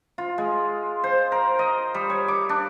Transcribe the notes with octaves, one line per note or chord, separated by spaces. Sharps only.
F4
G#3
C5
A#4
D#5
G3
C#5
D6
D4